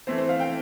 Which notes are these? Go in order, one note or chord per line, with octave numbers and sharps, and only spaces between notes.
E3 A3 C4 C5
C5
F5
G5